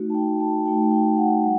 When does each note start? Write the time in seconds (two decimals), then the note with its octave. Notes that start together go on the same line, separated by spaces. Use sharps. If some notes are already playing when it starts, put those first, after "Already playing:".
Already playing: A3 D#4 F#4
0.10 A5
0.14 G5
0.40 A5
0.66 A3 D#4 F#4 G5
0.91 G5
1.17 F#5
1.43 G3 F#5